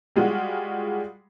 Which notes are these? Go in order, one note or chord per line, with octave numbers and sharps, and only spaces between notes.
G3 G#3 F4 F#4